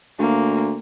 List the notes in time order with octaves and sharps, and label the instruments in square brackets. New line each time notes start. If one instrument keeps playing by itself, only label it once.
[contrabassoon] D2 [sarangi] A#3